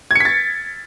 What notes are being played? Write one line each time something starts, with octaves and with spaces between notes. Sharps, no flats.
G#6 A6 B6 C#7